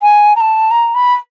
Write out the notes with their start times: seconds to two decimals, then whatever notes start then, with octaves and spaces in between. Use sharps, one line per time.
0.02 G#5
0.36 A#5
0.40 A5
0.71 A#5
0.95 B5